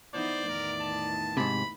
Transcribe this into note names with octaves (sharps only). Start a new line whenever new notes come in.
E3 B3 D#4 C5 D5
E2 A2 D#3 A#4
A5
G#2 C3 B5